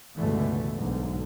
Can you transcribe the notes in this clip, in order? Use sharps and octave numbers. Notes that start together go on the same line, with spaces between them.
C#2 G2 B2 D3 E3 A3
B1 G#2 D3